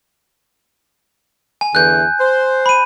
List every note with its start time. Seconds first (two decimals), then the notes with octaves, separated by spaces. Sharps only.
1.61 G#5
1.75 E2 D3 E3 F#6 G6
2.19 C5
2.66 B5 D#7